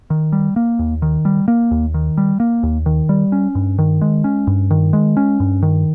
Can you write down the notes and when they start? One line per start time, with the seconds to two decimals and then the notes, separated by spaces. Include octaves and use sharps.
0.10 D#3
0.32 G3
0.56 A#3
0.79 D#2
1.02 D#3
1.25 G3
1.48 A#3
1.71 D#2
1.94 D#3
2.17 G3
2.40 A#3
2.63 D#2
2.86 D#3
3.09 G3
3.32 C#4
3.55 G2
3.79 D#3
4.01 G#3
4.24 C#4
4.47 G2
4.71 D#3
4.93 G#3
5.17 C#4
5.40 G2
5.62 D#3